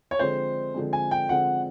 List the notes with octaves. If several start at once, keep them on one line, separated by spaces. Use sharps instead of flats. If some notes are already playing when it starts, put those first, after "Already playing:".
C#5
D3 F3 G#3 C4 C5
D3 F3 G#3 C4
G#5
G5
D3 F3 G#3 C4 F#5